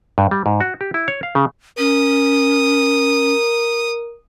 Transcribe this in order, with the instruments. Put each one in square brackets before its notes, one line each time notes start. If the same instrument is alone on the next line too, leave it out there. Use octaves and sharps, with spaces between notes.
[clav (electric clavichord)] G2
G3
G#2
F#4
G4
E4
C#5
F5
C#3
[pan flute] C#4 [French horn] A#4 [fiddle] D#6